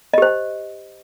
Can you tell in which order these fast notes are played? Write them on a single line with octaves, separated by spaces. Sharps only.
D#5 G4 C5